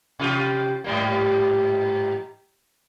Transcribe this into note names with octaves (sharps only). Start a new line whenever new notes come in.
C3 F4 G4
G#2 G3 A#3